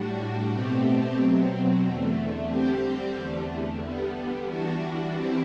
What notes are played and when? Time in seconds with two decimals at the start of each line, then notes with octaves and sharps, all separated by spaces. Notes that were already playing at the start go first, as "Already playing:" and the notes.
Already playing: A2 G3 D4 F#4
0.51 B2 A3 C4 G4
1.17 B2 F#3 C4
1.82 E2 D3 A3
2.48 D3 G3 C4 G4
3.14 E2 D3 A3
3.81 D3 G3 B3
4.46 E3 G3 D4 F#4
5.12 E3 G3 C4 E4 G4